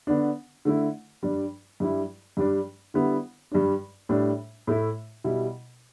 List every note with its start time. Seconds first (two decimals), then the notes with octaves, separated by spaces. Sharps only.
0.07 D3 B3 D4
0.65 D3 A3 E4
1.23 G2 G3 D4
1.80 G2 G3 E4
2.37 G2 G3 D4
2.94 D3 G3 B3 E4
3.52 G2 G3 D4
4.09 A2 G3 D4
4.67 A2 A3 E4
5.24 B2 G3 E4